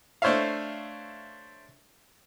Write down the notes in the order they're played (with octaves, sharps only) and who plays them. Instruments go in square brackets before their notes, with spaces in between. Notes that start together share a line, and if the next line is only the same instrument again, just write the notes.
[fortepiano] A3 D4 C5 C#5 E5 F5